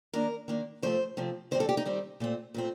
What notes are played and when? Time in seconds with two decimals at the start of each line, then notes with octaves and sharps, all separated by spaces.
0.13 D#3 A#3 D4 A#4
0.48 D#3 A#3 D4
0.82 C3 F3 A3 C4 C5
1.17 C3 F3 A3 C4
1.51 D#3 G3 C4 C5
1.60 A4
1.69 G4
1.77 D#4
1.85 D#3 G3 C4
2.20 A#2 A3 C4
2.54 A#2 A3 C4